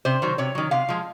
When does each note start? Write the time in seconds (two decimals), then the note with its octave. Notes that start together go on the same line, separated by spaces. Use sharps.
0.05 C3 C5
0.22 D#3 F#3
0.38 C3 C#5
0.55 D#3 F#3
0.71 C3 F5
0.89 F3 G#3